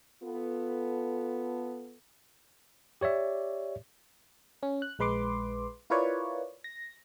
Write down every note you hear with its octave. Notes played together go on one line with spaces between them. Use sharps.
B3 F4 A4
G4 C#5 D5 E5
C#4
F#6
A#1 G#3 B4 C6 D6
E4 F4 A#4 B4 C#5 D5
A#6